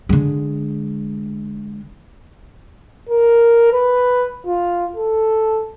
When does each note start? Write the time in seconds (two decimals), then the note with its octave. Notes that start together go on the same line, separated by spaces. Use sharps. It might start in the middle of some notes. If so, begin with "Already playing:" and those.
0.09 D3 G#3
3.09 A#4
3.73 B4
4.46 F4
4.96 A4